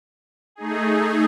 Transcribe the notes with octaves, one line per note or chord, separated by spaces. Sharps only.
A3 D#4 G#4